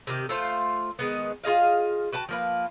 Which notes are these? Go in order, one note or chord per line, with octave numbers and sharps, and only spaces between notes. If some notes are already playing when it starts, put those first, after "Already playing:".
C3 D#3 G4
A3 F4 C5
D#3 G#3 B3
F4 G#4 D#5 F5
F#4 B4 G5 A5
F3 A#3 B4